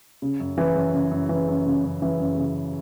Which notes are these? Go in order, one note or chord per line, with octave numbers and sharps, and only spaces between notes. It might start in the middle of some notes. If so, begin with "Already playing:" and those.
C#3
F#2
E3
F#2
C#3
F#2
E3
F#2
C#3
F#2
E3
F#2
C#3